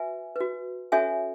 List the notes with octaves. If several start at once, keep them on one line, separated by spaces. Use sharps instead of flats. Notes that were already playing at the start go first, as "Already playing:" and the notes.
Already playing: F#4 B4 E5 G#5
F#4 B4
C#4 F#4 A4 C#5 E5 G#5